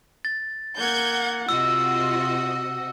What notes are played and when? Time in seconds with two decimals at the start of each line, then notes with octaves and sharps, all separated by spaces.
0.25 A6
0.78 A#3 F#5 G6 G#6
1.49 C3 F4 F#4 D#5 E6